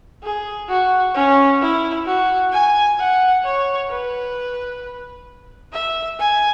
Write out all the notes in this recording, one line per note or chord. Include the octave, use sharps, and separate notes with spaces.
G#4
F#4
C#4
E4
F#4
G#5
F#5
C#5
B4
E5
G#5